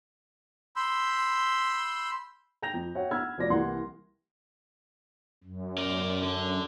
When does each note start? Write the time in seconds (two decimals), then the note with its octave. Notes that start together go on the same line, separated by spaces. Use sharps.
0.76 B5 C6 E6 G6
2.62 G5 A#5 G6 A#6 F7
2.74 F2
2.95 F#4 C#5 E5 F#5 G5
3.11 F#5 B5 E6 F6 G#6
3.38 F1 F4 F#4 D5 A#6
3.50 C2 E3 A#3 F#5 C6
5.44 F#2
5.78 A#4 D5
6.22 D3